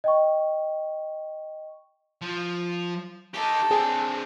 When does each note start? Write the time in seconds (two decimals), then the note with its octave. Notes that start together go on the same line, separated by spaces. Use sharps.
0.04 D#5 G5 C#6
2.21 F3
3.34 D#4 G4 A4
3.71 C4 D4 G#4